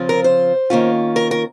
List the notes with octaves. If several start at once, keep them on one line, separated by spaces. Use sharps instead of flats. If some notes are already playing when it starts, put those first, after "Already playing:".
Already playing: C#3 F3 C4 F4
A#4
C5
D#3 A#3 C#4 F4
A#4
A#4